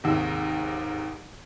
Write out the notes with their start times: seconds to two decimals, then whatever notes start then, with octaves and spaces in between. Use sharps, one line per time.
0.04 D#2 G#2 C3